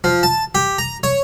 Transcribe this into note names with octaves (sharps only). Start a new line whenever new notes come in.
F3
A5
G4
A#5
C#5